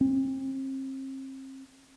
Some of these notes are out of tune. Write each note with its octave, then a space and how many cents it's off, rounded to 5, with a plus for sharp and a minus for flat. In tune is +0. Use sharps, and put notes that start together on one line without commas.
C4 +40